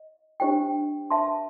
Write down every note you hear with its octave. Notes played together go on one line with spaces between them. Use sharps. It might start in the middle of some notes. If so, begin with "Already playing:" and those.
Already playing: D#5
D4 G4 C5 D#5 G5
B4 E5 A5 C6